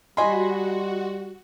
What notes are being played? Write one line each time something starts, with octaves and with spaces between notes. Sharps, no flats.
G3 F#4 C5 D#5 G#5 B5 C6